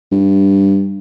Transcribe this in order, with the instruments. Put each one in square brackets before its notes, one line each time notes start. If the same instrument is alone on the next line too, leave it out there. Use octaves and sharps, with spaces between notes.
[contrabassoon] G2